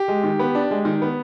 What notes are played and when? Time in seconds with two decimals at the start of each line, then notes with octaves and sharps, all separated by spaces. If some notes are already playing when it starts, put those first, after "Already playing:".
Already playing: G4
0.08 G#3
0.24 D#3
0.39 B3
0.55 D4
0.71 G#3
0.85 D#3
1.02 B3